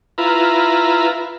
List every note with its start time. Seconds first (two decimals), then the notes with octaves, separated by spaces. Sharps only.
0.18 E4 F4 B4 A#5